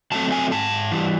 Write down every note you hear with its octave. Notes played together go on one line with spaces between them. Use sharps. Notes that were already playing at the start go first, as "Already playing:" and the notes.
F#3 A3 C4 A5
G#5
G#2 A5
E3 G3